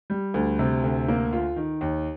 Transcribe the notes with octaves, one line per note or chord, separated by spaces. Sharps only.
G3
D2
C3
D2
A#3
F4
D#3
D#2